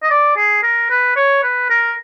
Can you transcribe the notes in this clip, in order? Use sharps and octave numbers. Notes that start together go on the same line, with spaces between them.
D#5
D5
G#4
A#4
B4
C#5
B4
A#4